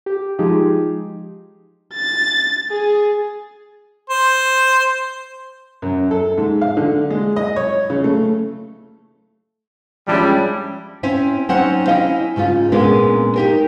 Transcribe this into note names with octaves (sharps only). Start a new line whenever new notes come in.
G4
F3 G#3 D#4 F4 G4 G#4
A6
G#4
C5
F#2
A4
G#2
F5
D3
G#3
D#5
C#5
C#3
A3
F3 G3 G#3 C#4 D4 E4
C4 C#4 E4
F#3 C4 C#4 D#4 C5 F#5
C#4 E4 D#5 F5
G#2 C#3 C#4 F4
A#2 G#3 B3 C#4 D4 A#4
D#4 G4 A#4